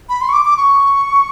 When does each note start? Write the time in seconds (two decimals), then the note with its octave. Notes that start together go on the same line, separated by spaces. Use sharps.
0.09 B5
0.21 C6
0.29 C#6
0.33 D6
0.45 D6
0.57 C#6